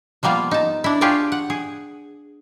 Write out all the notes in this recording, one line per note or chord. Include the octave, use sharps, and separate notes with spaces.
F3 G3 A#3 B3 F4
D#4 A5
D4 E4
D4 F4 G4 G#4 C#5 D5
F#5
G#4